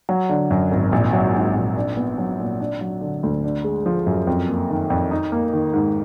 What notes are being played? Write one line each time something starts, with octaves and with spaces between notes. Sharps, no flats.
F#3
D3
F#2
G#1
A#1
F#3
G#2
A#1
D4
B3
F#3
A#2
D4
F#3
D3
D2
D4
G#3
F3
F#2
F2
A#3
D#3
F2
D#4
A#3
D#3
G#2